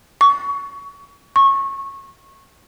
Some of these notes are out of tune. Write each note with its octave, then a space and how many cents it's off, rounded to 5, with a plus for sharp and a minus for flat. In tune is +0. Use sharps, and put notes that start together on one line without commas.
C#6 +20
C#6 -20